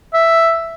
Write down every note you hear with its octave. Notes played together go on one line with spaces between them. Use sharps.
E5